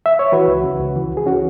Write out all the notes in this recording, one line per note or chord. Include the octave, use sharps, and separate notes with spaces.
E5
C#5
E3 F#4 B4
C#2
C#3
C#2
E3
C#2
G#4
E3 C#4 F#4